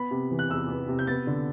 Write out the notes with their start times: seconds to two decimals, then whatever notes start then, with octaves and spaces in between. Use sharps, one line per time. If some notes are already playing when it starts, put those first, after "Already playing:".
Already playing: B3 B5
0.11 C3
0.31 E3
0.39 F#6
0.49 E2 E6
0.69 B3
0.88 C3
0.99 G6
1.07 B3 A6
1.27 D3